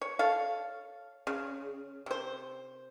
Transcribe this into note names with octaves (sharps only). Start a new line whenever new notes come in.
C#5
A4 C#5 F5
C#3
C3 C5